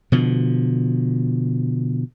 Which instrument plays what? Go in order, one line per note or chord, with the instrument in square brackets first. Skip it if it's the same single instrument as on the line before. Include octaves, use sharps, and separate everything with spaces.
[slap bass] B2 D3 F3